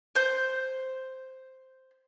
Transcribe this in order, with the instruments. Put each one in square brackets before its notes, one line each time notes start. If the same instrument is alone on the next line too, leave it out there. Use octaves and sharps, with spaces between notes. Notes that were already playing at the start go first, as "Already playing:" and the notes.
[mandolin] C5 G6